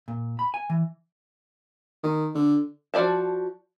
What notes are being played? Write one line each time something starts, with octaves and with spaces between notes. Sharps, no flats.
A#2
B5
G#5
E3
D#3
D3
F3 F#4 D5 E5 A5